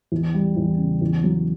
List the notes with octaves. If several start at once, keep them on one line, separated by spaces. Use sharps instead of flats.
E2
G3
E2
C#3
E2
F#3